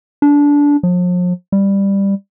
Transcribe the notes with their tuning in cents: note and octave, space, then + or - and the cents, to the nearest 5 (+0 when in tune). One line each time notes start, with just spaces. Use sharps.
D4 -20
F3 +40
G3 +10